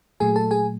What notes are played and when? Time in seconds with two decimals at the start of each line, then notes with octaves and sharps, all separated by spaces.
0.20 A#2 F#3 A3 G#4 G#5
0.36 A4 A5
0.51 G#4 G#5